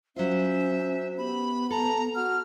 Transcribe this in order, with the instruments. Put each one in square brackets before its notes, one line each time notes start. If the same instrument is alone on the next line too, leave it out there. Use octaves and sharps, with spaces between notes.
[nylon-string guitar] F#3 F4 [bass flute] C#4 [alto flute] C5 [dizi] E5
[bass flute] B3 [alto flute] G4 [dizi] B5
[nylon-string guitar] A4 [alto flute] A5 [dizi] A#5
[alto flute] F#4 [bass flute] F#5 [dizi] F6